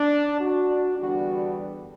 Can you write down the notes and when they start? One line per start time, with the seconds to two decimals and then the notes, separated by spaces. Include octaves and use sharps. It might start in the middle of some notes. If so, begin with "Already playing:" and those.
Already playing: D4
0.41 D4 F#4
0.99 E2 D3 G3 B3 D4 F#4